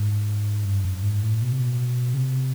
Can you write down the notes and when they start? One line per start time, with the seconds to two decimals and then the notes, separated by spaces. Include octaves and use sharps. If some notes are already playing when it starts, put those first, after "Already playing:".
Already playing: G#2
0.65 G2
0.85 F#2
1.03 G#2
1.23 A2
1.42 B2
1.52 C3
1.61 B2
2.14 C#3
2.17 C3